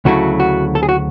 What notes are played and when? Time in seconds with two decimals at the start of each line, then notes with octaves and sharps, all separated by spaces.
0.05 D2 C#3 F#3 A3 E4 F#4
0.40 F#4
0.75 A4
0.83 G#4
0.89 F#4